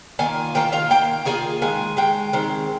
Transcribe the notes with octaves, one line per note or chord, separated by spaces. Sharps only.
D#3 A#3 F4 G#5
D#3 A#3 F4 G5
F4 F5
D#3 A#3 F4 G5
D#3 A#3 F4 G#4 G#5
D#3 G#3 G#5
D#3 G#3 G5
D#3 G#3 C4